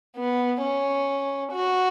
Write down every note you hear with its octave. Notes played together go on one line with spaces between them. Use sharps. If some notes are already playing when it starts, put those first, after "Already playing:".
B3
C#4
F#4